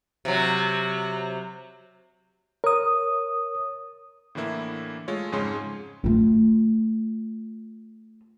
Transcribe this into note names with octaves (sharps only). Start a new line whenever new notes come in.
C3 F#3
A#4 C#5 D#6
A2 D3 E3 A#3 E4
G#3 A3 F4 C#5
F2 G#2 C#3 G#3 C#5 C6
A3 F4